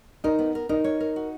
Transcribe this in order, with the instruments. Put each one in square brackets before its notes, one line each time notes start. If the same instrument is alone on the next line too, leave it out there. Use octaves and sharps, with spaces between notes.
[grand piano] D#4 [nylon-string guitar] A#4
[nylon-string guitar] B3
A#4
[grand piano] D#4 [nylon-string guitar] A#4
[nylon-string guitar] C#5
A#4
F#4